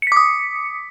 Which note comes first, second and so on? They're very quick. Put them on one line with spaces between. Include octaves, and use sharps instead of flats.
C#7 B6 D6 D#6